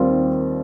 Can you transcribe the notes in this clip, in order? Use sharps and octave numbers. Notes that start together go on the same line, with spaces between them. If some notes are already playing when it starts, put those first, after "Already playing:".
Already playing: D#2 D#3 G3 C4 F4